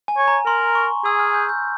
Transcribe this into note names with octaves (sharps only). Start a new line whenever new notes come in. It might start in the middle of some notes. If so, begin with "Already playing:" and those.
G#5
C#5
A#5
A#4 C6
C#6
G#4 E6
F6
G6
G6